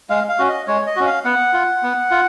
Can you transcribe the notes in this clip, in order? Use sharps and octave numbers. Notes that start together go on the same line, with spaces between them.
G#3 F5
F5
C#4 F#4
D#5
G#3 C#5
D#5
C#4 F#4
F5
B3 F#5
F4
B3
F4